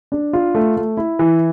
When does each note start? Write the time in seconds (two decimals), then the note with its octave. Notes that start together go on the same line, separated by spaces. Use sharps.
0.12 D4
0.33 F4
0.55 A3
0.77 A3
0.97 E4
1.19 E3